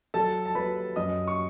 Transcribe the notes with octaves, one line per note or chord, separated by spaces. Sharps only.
F#3 A4 A5
A5
F#3 B4 B5
F#2 D#5 D#6
C#6